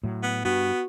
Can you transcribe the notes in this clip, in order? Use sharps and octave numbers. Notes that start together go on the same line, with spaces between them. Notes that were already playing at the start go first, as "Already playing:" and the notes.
A2 F#3
B3
G2 B3 F#4